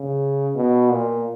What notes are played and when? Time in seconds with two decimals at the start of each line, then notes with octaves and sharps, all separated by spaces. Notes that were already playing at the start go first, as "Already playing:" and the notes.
Already playing: C#3
0.55 B2
0.90 A#2